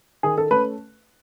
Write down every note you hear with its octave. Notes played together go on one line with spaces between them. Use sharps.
D#3 G#4
A4
A3 C#4 B4